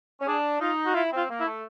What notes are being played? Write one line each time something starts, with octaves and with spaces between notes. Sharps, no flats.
C#4
D4 G#4
D#4 F4
F#4
E4 F4
C4 F4
A#3
E4
A3